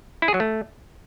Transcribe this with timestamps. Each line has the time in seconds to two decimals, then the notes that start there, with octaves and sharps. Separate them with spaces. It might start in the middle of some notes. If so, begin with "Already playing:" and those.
0.22 E4
0.28 G#4
0.34 F#3
0.40 A3